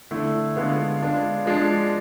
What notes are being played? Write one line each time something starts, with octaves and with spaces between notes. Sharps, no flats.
D3 A3 E4
D3 G#3 B3 F4
G#3 D4 F4
F3 G#3 D4